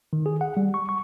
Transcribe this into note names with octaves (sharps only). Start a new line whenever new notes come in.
D#3
G#4
F#5
G3
C#6
C#6